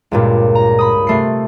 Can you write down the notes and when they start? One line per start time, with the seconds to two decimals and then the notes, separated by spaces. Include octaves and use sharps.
0.12 C#2 G2 A#2
0.55 A#5
0.79 B5 D#6
1.07 C3 A3 C7